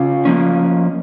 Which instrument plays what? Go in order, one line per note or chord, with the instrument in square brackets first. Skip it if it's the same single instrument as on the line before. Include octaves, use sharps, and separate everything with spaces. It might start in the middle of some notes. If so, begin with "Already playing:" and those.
Already playing: [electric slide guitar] C#3 F4
F3 A#3 C#4